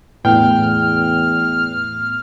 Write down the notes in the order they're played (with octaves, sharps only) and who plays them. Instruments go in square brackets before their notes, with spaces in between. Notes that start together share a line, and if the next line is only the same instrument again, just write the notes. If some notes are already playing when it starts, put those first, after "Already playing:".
[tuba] E2 [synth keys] A2 B3 [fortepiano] G5 [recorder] F6